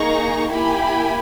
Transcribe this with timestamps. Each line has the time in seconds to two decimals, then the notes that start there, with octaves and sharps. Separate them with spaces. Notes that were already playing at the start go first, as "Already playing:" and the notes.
Already playing: A#3 D#4 G#4 A#5 C#6
0.51 A#3 E4 G4 G#5 B5